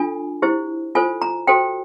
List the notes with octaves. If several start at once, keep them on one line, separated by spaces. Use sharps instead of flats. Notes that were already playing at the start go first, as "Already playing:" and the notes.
Already playing: D4 F4 A4 G#5
E4 G4 C5
F4 A4 C5 G#5
A#5
F#4 A4 C5 G5